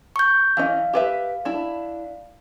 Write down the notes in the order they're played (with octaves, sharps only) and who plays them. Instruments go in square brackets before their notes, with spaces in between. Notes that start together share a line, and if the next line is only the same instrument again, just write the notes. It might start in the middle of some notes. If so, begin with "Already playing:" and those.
[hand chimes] C#6 G6
[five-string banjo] E3 C#4 D#5 [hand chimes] F5
[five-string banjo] G4 B4 E5
D4 E4